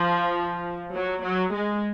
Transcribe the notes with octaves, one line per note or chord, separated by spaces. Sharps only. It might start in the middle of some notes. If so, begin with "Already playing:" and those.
Already playing: F3
F#3
F#3
G#3